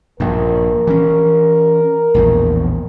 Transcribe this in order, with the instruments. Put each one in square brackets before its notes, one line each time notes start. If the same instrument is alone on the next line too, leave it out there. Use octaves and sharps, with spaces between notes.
[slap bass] A#1 G2 [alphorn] A#4
[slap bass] E3 C#4
A#1 E2 A2